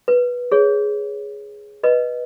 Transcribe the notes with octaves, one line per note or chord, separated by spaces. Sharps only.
B4
G#4 C#5
B4 D#5